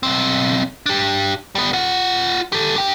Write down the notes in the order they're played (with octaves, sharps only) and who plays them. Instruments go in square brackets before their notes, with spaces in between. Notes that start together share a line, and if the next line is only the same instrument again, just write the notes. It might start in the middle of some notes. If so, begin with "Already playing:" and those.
[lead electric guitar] B1 C4
D4 G4
G3 B3
F4 F#5
G4 A4
D4 G5